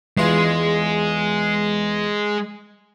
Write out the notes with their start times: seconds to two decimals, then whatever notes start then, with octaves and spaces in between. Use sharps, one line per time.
0.18 E2 G#3 F4